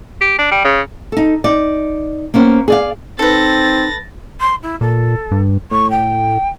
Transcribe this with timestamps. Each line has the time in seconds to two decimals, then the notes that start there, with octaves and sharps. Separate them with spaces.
0.21 G4
0.39 D4
0.51 G3
0.64 C#3
1.12 D#4 A4
1.44 D#4 D5
2.34 A#3 B3 C#4 C5
2.68 G#4 D5 F5
3.19 C4 D#4 A4 B4 A6 A#6
4.40 C6
4.63 E4
4.81 A#2 A4
5.31 G2
5.71 A2 C#6
5.90 G5